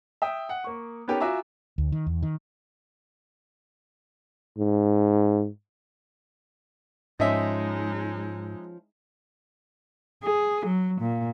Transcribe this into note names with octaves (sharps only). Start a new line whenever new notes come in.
E5 G5 D#6
F#5
A#3 C#6
B3 C#4 D#4 G4 A4 A#4
F4 F#4 E5 G#5 A#5 D6
D2
D#3
E2
D#3
G#2
G#2 F3 G#3 C#4 D#4 D#5 E5
G#4
F#3
A#2